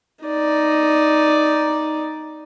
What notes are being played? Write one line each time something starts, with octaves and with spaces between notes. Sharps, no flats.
D#4 D5